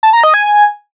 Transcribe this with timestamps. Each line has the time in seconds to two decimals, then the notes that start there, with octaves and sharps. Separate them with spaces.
0.03 A5
0.13 A#5
0.23 D#5
0.34 G#5